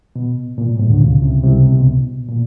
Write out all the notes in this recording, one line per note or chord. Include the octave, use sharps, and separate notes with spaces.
B2
A#2
A2
G#2
D2 D3
C#2 C#3
C2 C3
C2 C3
B2
A#2